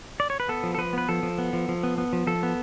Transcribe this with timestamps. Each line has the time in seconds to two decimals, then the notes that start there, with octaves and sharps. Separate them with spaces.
0.20 D5
0.30 C#5
0.40 B4
0.48 B3 A4
0.63 F3
0.75 A4
0.78 F3 B4
0.93 B3 B4
1.09 F3 A4
1.23 F3
1.38 B3
1.53 F3
1.69 F3
1.83 B3
1.98 B3
2.13 F3
2.27 F3 A4
2.43 B3